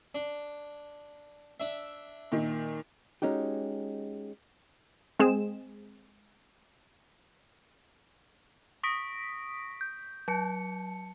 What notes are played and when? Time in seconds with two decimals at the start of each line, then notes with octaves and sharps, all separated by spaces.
0.15 D4
1.60 D4 E5
2.32 A#2 D#3
3.22 G#3 C#4 D#4 F#4 G4
5.19 G#3 C4 G#4 E7
8.83 C#6 D#6 A#6 B6 D7
9.81 G6
10.28 F#3 A5 C#7